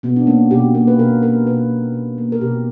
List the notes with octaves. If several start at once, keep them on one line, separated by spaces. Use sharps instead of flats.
B2 B3
D4
A#3 C#4
B2 G4
A#3
B4
B2 A#4
A#3 A#4
B2 B4
A#3
B2
A#3
A#4
B2 G4